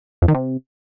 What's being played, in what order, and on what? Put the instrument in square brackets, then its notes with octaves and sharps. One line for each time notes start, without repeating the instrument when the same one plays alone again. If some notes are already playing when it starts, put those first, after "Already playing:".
[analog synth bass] F2
D#3
C3